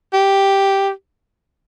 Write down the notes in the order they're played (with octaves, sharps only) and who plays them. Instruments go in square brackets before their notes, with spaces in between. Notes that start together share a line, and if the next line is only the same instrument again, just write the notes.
[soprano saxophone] G4